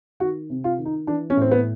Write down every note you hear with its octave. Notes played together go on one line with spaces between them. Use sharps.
D#3 F#4
C3
F4
D#3
D#4
E3 D4
C#4
A2 C4
B3